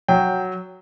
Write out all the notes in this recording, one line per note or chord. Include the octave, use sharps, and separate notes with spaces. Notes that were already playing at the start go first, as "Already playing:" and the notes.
F#3 G5